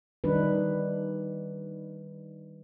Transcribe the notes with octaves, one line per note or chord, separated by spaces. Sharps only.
D#3 G3 D4 D#4 B4